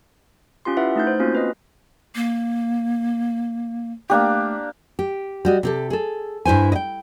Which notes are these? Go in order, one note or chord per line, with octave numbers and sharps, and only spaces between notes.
C#4 F4 G4 C6
E4 B4 E5 F#5
A3 D#4 G6
C5
A#3 C4 C#4 F4 F#4
B4 D#5
A#3
A3 A#3 D4 G4
G4
G3 F#4 D#5
C3 G4 A4
G#4 A4
G2 E4 C5 G#5
D#5 G5